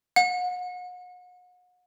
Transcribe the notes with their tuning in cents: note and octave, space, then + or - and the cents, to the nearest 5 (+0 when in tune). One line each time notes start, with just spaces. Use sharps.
F#5 -40